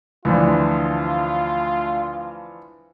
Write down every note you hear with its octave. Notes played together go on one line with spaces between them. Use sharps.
D2 E3 F3 D4 F4